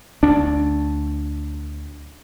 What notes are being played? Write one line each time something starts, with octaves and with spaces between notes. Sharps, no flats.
D2 D4